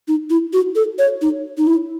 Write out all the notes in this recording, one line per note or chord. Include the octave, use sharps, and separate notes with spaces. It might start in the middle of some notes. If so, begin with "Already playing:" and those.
D#4
E4
F#4
A4
C#5
D#4
D#4
E4